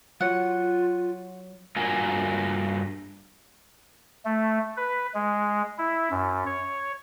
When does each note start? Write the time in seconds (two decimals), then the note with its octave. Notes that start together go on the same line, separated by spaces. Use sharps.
0.21 F#3 F4 C#5 F#5
1.76 G2 A#3 F4 F#4 A#4 G#5
4.25 A3
4.77 B4
5.14 G#3
5.78 E4
6.11 F#2
6.46 C#5